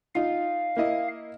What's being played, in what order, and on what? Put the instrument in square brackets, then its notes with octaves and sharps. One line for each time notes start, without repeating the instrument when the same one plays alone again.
[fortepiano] D#4 F4 [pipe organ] F5
[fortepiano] A#3 E4 D#5